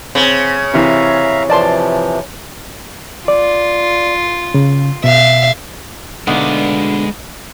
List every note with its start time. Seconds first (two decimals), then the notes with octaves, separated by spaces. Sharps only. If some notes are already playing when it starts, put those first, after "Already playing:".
0.15 C#3 C4
0.74 C3 E3 E5 F5 A#5
1.50 C3 E3 F3 D5 A5 C6
3.28 F4 D5
4.54 C#3
5.04 B2 E5 F5
6.27 D2 B2 D3 G#3 B3 D#4 F5